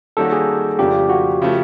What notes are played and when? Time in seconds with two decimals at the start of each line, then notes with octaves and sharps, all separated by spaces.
0.17 D#3 G3 A#3 C#4 F#4 A4
0.32 G#4
0.78 F2 C#3 F3 A3 D4 G4
1.09 F#4
1.42 C#3 F3 A3